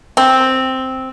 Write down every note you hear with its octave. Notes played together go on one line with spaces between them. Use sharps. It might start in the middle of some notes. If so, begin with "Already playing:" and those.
C4